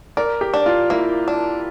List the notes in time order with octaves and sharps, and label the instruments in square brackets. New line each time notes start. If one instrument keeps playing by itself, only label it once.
[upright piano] A#4 [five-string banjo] D5
[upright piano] G4
[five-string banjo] D4
[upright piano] F4
[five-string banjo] A#3 [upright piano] E4
[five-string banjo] D4